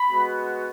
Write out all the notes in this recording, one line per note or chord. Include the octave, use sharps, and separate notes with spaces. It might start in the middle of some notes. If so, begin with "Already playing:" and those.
Already playing: B5
G#3 B3 F#4